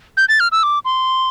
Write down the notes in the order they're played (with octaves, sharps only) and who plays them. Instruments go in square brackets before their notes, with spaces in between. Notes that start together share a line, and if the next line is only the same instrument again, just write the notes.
[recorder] G6
A6
F6
E6
D6
C6